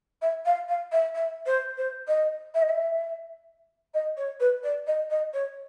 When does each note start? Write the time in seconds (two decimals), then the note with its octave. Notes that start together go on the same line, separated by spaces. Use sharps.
0.21 E5
0.45 F5
0.68 F5
0.92 E5
1.15 E5
1.46 C5
1.77 C5
2.07 D#5
2.54 E5
2.62 D#5
2.69 E5
3.94 D#5
4.17 C#5
4.40 B4
4.63 D5
4.87 D#5
5.10 D#5
5.33 C#5